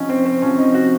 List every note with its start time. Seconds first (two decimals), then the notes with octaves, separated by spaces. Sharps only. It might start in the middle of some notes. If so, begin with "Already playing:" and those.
Already playing: C3 F3 C#4 D#4
0.09 C4
0.25 C4
0.42 C3 F3 C#4
0.58 D#4
0.74 F#4